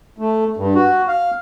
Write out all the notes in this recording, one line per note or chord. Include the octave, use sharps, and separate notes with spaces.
A3
G2
F#4
F5